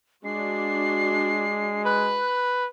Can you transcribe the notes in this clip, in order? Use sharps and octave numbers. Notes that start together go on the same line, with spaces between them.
G#3 D4 F#4 C7
B4 F#6